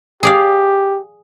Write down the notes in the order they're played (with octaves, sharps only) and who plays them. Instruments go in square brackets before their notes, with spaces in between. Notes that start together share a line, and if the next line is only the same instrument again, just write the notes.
[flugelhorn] G4 [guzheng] G#4 D5 F5